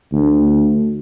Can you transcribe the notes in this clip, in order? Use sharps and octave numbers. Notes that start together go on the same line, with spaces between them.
D2